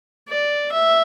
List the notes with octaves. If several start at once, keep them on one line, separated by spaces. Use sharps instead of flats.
D5
E5